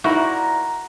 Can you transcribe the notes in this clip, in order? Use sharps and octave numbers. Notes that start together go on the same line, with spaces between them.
A#2 D#4 E4 F#4 A#4